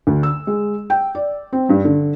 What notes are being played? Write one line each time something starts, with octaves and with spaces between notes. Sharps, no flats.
D2
E6
G#3
G5
D5
C4
G2
D3